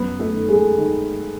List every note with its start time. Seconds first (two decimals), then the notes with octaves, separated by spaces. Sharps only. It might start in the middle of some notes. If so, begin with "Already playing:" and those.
Already playing: F#2 B3 B4
0.19 A3 A4
0.34 D#3
0.48 G#3 G#4
0.77 D#3